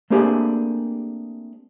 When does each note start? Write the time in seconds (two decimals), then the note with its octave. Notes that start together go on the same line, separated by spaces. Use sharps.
0.10 A3 A#3 C4 D4 G4 G#4